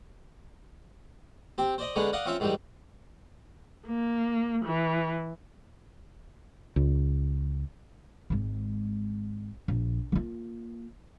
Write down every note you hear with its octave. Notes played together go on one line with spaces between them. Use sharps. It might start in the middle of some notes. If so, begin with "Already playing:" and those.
C4 G4
C5 D5 D#5
D3 G#3 B3 C#4 D4
D5 D#5 F5 F#5
C4 C#4 F4 C#5 E5
G#2 D#3 E3 G3
A#3
E3
C#2
G#1 G#3
A#1
A#3 F4